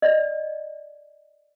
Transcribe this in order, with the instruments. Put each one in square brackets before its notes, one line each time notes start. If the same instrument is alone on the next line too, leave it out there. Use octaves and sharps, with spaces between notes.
[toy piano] D5 D#5